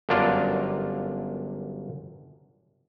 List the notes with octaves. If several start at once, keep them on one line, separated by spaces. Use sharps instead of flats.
G1 F#2 A#3 D4 F4 D5